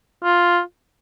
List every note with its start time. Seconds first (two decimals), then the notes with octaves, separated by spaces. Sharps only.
0.24 F4